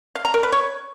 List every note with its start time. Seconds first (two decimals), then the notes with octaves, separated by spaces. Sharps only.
0.15 F5
0.25 A#5
0.34 A#4
0.43 B4
0.52 C#5